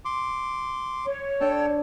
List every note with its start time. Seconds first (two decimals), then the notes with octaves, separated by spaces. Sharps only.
0.05 C6 D6
1.05 C#5
1.41 D4 A4 G5 A5